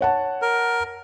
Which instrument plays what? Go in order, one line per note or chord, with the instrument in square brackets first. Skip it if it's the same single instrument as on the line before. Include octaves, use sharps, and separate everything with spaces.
[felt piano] C#5 F#5 A5
[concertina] A#4